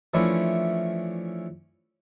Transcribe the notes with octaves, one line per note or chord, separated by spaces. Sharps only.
E3 F3 A3 C#4 D4 E4